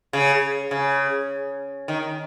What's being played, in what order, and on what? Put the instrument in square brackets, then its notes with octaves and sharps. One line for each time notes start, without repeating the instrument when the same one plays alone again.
[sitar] C#3
C#3
D#3